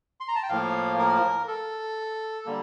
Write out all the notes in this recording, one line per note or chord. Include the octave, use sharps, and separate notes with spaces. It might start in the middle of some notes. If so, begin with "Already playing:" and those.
C6
A#5
A5
G5
A2 F3 A#3 F5
A#4
A4
D3 G3 A#3